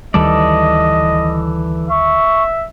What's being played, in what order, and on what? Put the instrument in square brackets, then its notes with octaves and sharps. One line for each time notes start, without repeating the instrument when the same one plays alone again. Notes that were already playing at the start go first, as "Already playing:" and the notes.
[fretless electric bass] D2 D#3 G3 [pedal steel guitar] E3 A4 D5 [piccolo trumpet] D#5
[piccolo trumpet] E5 [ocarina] C#6